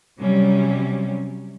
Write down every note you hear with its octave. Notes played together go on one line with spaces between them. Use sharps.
C3 F#3 G3 C#4